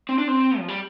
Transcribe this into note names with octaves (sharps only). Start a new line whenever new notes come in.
C4
D4
C4
F3
G3